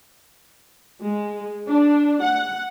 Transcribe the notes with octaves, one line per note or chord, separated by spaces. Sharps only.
G#3
D4
F#5